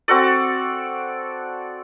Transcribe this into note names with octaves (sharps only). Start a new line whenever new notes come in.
C4 F#4 A4 D5